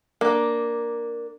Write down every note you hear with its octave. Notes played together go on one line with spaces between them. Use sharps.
A#3 D4